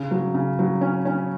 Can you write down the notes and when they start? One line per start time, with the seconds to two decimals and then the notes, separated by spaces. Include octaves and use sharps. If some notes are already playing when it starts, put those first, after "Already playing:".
Already playing: C#3
0.11 F#3
0.34 C#3
0.59 F#3
0.81 C#4
1.05 C#4